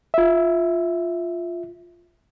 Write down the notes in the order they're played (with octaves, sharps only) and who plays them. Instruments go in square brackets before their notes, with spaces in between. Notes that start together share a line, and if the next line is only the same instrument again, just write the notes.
[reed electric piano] F4 E5